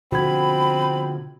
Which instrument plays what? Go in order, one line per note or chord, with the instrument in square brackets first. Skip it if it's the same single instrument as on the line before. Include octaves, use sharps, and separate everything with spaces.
[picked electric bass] B2 D3 F3 [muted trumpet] C4 [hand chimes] F#4 G#6 [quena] B5